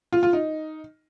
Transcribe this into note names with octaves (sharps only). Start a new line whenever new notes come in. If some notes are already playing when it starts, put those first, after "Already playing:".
F4
F4
D#4